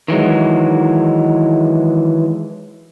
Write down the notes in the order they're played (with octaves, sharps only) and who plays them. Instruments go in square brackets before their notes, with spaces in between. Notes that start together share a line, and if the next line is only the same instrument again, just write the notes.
[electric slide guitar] D#3 E3 F#3 G#3